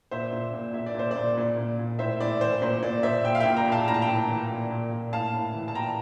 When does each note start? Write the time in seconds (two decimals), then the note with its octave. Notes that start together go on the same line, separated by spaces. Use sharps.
0.11 A#2 C5 E5
0.33 A#2
0.54 A#2
0.74 A#2 E5
0.86 D5
0.95 A#2 C5
1.11 A#2 D5
1.37 A#2
1.57 A#2
1.79 A#2
1.99 A2 C5 E5
2.20 A2 D5
2.41 E3 C5
2.62 A#2 C5
2.83 A#2 D5
3.03 A#2 C5 E5
3.24 A#2 E5 G5
3.35 F5
3.40 A#2 E5 G5
3.56 G5 A#5
3.67 A#2
3.72 F5 A5
3.87 A2 A#5
3.94 A5
4.02 G5 A#5
4.08 A2
4.28 E3
4.50 A#2
4.70 A#2
4.91 A#2
5.13 A2 F5 A5
5.33 A2
5.54 E3
5.68 A5
5.75 A#2 G5 A#5